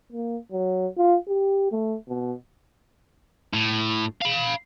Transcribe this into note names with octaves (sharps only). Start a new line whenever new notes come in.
A#3
F#3
F4
G4
A3
B2
A2
F5 B5